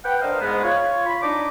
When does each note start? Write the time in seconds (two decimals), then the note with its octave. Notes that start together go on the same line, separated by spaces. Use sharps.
0.05 B4 F#5 G5
0.22 D4 A#4 C5 D#5 F5
0.41 G#2 G#3 B3
0.64 F4 C#5
1.06 B5
1.22 D4 D#4 D6